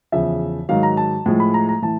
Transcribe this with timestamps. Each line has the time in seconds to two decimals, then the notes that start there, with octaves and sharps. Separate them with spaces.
0.12 E2 C#3 F3 E5
0.69 G#2 D#3 F#3 F5
0.83 A#5
0.97 A5
1.26 A2 F3 G#3
1.40 B5
1.54 A#5
1.69 A#5
1.82 A2 E3 A5